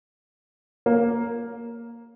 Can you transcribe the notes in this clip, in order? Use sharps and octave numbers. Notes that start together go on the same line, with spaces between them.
A#3